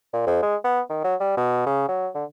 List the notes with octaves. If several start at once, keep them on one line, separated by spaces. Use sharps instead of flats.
A#2
F2
G#3
B3
D#3
F#3
G3
B2
C#3
F#3
D3